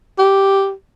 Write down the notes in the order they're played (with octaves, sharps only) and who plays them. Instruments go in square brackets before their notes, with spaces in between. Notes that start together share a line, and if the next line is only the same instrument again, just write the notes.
[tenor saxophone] G4